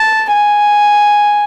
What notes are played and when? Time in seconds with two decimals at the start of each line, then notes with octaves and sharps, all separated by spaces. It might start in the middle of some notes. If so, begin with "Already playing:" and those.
Already playing: A5
0.32 G#5